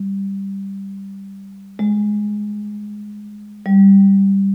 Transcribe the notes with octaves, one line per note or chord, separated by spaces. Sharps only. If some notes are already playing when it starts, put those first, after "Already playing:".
Already playing: G3
G#3
G3